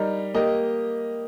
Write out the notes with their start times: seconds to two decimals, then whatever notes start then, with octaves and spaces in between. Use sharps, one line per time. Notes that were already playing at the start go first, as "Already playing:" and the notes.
Already playing: G3 D#4 A#4
0.34 A#3 G4 D#5